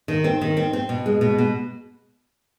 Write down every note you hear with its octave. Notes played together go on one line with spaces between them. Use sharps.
D#3
C4
D#3
C4
C4
B2
G#3
B2
B2